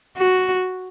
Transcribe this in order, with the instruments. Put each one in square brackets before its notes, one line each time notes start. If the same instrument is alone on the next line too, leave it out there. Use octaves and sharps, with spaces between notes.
[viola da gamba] F#4